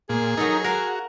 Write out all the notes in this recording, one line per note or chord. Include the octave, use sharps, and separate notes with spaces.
A#2 G#4
F#3 D#4 A4 A#4
F#4 A#4 F5